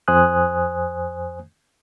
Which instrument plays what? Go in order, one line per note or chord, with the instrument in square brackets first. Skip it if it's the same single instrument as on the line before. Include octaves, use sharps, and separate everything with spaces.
[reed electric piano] F2 C5 G#5 D#6 F#6